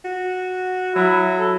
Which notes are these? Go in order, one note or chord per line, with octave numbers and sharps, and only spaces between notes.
F#4
F#3 E4
A4